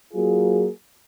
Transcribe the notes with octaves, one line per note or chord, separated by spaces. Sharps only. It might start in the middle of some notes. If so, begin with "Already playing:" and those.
F#3 A#3 F4 G#4